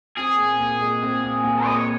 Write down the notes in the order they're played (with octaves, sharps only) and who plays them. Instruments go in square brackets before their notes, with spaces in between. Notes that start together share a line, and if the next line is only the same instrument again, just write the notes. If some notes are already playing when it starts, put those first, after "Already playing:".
[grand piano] C4 [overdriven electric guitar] G#4
[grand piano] A#2
A#2
G#3
C4
A#2
A#2
[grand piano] G#3 [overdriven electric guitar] D#5
[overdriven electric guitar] C#5